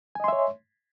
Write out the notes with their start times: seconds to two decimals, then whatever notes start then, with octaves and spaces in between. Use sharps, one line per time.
0.15 G#5
0.20 D#5
0.24 C6
0.28 E5
0.33 C#5